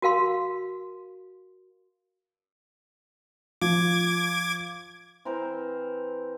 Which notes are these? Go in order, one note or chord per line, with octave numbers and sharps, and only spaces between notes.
F#4 A#4 F5 C6
F3 D6 G#6
E3 C4 A#4 C5